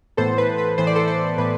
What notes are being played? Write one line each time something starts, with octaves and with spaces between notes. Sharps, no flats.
A2 E3 B3 A4 C5
B4
B4
A2 E3 B3 C5
D5
A4 C5
A4 C5
A2 E3 B3 B4